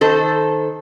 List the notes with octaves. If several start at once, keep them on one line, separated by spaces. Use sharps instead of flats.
D#3 A4 C5